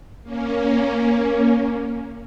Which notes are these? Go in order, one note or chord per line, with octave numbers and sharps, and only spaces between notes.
A#3 C#4